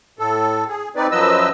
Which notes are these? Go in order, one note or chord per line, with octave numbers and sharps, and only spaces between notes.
A2 A4
G#4
C4 D#4 B4 D5
F#2 F3 F#3 B4 D#5 E6